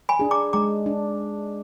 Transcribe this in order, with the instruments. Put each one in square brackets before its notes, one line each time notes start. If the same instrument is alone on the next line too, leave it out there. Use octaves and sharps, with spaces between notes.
[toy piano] G#5 B5
[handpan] D4 G#4
[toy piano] A#5 D6
[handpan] G#3 [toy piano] A#5 D6
[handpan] D4